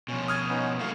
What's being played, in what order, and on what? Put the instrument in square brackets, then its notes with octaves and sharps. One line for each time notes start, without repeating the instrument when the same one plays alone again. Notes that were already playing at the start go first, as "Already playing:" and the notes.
[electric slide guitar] B2 F3 [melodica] C#4
[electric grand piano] D#6 F6 G#6
[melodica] B3 C#4 D#4
[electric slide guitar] F#3 A3 A#3 [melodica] F5 C#6